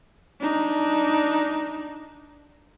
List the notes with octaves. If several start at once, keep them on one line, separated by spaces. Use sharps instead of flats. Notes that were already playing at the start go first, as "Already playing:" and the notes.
D4 D#4